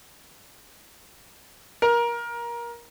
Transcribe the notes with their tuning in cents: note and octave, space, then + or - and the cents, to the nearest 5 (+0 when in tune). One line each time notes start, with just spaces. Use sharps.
A#4 +20